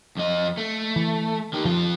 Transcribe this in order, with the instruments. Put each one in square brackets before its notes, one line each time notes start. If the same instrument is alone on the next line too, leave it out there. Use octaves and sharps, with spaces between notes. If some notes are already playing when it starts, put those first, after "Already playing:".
[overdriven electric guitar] F2 D#5
A3
[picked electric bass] E3
[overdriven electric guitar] D#3 G4
[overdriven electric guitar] F2 F4 [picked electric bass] F3